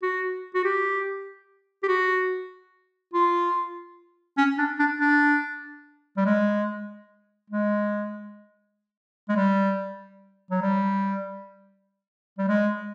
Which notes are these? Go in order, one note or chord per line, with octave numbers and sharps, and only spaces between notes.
F#4
F#4
G4
G4
F#4
F4
C#4
D4
D4
D4
G3
G#3
G#3
G#3
G3
F#3
G3
G3
G#3